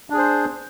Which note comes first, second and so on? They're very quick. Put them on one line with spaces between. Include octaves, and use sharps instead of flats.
D4 G#4 C5